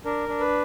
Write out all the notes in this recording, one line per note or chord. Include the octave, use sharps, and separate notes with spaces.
D4 A#4
D4
B4